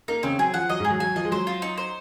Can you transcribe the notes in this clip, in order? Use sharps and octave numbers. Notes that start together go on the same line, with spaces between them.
A#3 D#4 A#4
C#3 C4 C#4
F#3 G#4
F3 F#5
F#3 D#5
G#2 G#3
G#4
F#3
F#3 G#5
F3 D#5
G#3
F#3 C5
F4
D#4
C5